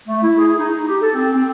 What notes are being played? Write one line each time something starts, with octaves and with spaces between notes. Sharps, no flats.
A3
E4
G#4
D#4
G4
A4
C4
C4